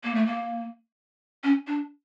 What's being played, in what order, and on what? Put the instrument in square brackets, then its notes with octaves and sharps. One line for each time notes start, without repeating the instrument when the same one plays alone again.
[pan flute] A#3
A3
A#3
C#4
D4